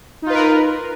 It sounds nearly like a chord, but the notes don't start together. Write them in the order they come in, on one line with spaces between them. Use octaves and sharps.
D#4 F4 B4 A#4